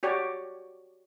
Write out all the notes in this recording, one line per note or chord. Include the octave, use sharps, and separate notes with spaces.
F#4 G4 C#5 D5